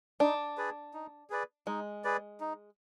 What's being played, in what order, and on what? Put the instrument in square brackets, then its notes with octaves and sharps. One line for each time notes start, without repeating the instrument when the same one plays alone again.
[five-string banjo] D4 [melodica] D#4
[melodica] G#4 B4 D5
D#4
G#4 B4 D5
[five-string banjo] G#3 [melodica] D#4
[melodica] G#4 B4 D5
D#4